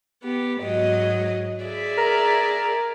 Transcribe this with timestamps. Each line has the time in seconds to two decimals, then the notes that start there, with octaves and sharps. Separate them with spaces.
0.22 B3 G4
0.59 G#2 F#3 D#5
1.63 G#4 D5 E5
1.98 A#4